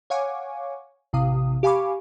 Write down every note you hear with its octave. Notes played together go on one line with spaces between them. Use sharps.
C#5 F5 F#5 G#5 C#6 D6
A1 C3 F5 D#6
G4 F5 G#5 B5 C#6 D6